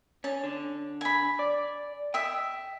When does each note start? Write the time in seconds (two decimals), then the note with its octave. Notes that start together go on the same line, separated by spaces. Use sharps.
0.24 C#4 A5
0.44 D3
1.01 G#5 B5
1.39 D5
2.14 D#5 E5 G5